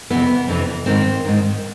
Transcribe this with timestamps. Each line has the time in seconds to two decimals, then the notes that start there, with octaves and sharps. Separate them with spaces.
0.10 F2 C3 E3 B3
0.48 F2 C3 E3
0.86 G#2 D#3 C4
1.25 G#2 D#3